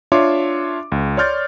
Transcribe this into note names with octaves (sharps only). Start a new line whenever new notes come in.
D4 F4 C#5 E5 C6 D6
C#2
C#5 D5 C6 F6 G6 A6